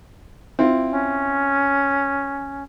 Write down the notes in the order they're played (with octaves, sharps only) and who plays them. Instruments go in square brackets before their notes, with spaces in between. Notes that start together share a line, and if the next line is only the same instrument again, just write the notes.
[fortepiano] C4 E4 F4
[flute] C#4